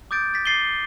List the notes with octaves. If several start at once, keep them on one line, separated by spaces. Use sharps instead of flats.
D6 D#6 G6 A6 D7
A6 B6
D6 A6 C7 D#7 F#7 G7